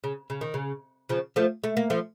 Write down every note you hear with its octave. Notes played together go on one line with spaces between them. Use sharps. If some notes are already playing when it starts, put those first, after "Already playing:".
C#3
C#3
D#3
C#3
C#3 F3
F3 A3
A3
A#3
F3 A3